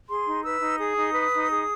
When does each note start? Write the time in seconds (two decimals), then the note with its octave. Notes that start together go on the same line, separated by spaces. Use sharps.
0.08 G#4 C6
0.26 D#4
0.44 B4 E6
0.61 D#4
0.79 G#4 D#6
0.96 D#4
1.14 B4
1.32 D#4
1.50 G#4